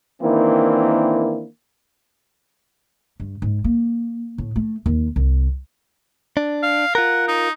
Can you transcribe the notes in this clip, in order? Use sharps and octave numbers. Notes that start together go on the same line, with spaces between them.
D#3 E3 A#3 C4 D4 E4
G2
G#2
A#3
A2
A3
D#2
C2
D4
F5
F4 A#4 F#5
D#4